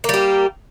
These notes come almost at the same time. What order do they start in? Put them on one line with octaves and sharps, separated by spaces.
A#3 G3 G4